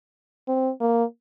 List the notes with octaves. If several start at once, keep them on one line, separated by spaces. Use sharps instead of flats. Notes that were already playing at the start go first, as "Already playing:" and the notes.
C4
A#3